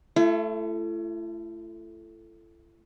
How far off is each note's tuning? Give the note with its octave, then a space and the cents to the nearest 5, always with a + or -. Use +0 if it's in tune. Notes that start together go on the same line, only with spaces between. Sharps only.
A3 +0 E4 +45